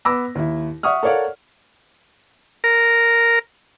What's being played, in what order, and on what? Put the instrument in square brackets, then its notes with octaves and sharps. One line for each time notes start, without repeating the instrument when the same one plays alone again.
[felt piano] B3 B5 D6 E6 A#6
D#2 E4
E5 F#5 C#6 D#6 F6
A4 A#4 C#5 D5 F5 F#5
[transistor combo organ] A#4